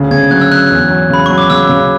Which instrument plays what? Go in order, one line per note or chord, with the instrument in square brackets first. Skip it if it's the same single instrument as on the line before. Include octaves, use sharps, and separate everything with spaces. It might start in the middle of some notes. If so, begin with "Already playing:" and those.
Already playing: [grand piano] D2 C#3
[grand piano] C#3 [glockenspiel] G#6
[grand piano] F#3 [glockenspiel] F#6
[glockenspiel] E6
[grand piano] F#3 [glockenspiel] F#6
[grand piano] E2
F#3
[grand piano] C#3 [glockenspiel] B5
[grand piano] F#3 [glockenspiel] C#6
[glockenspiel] D6
[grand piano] C#3 [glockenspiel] E6
[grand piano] C#3